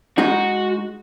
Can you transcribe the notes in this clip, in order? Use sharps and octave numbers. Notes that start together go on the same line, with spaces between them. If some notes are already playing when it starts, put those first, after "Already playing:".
G#3 D#4 F#4